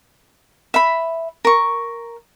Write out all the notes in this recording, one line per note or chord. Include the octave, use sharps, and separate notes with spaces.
E5 B5
A#4 C#6